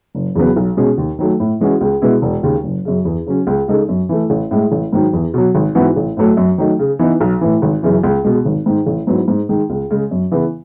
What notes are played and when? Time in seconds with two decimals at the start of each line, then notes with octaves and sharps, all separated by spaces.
0.15 F#1
0.36 E2 C#3 F#3 B3
0.56 B1
0.77 B2 G#3 C#4 G#4
0.98 D#2
1.19 D#3 F#3 A3
1.40 A2
1.60 E3 G#3 C#4 F#4
1.81 C#2
2.02 B2 G#3 B3 E4
2.22 E1
2.43 D#2 C#3
2.64 F#1
2.85 F#2 C#3
3.05 E2
3.26 C#3 F#3 C#4
3.47 C#2
3.68 C#3 G#3 D#4 A4
3.89 F#2
4.09 E3 A3
4.30 A1
4.51 A2 G#3
4.72 A1
4.93 G#2 D#3 F#3
5.13 E2
5.34 B2 F#3
5.55 G#1
5.75 G#2 E3 B3 F#4
5.96 A1
6.17 A2 F#3 A3
6.37 F#2
6.58 D#3 F#3 A3 D#4
6.79 C#3
6.99 E3 B3 D#4
7.21 B1
7.41 A2 E3
7.62 G#1
7.83 F#2 C#3 E3
8.04 C#2
8.25 B2 G#3
8.45 G#1
8.66 G#2 D#3
8.87 A1
9.07 G#2 F#3 B3 E4
9.28 G#2
9.49 D#3 G#3
9.70 C#2
9.90 C#3 G#3
10.11 F#2
10.31 C#3 E3 B3